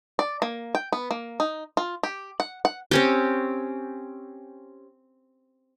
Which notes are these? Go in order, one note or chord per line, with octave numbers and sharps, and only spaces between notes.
D5
A#3
G5
B3
A#3
D#4
F4
G4
F#5
F#5
C4 C#4 G4